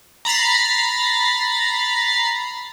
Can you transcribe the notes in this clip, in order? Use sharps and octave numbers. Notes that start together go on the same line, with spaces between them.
A#5 B5 A6 C7